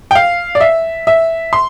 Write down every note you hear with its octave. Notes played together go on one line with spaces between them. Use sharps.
G5
F5
D5
E5
E5
C6